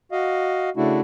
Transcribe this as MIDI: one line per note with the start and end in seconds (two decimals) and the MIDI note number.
0.12 0.70 66
0.12 0.70 75
0.12 0.70 77
0.77 1.01 49
0.77 1.01 57
0.77 1.01 62
0.77 1.01 64
0.77 1.01 66